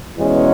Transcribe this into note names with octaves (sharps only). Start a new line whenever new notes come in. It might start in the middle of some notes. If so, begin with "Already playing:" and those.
E2 B2 G#3 C#4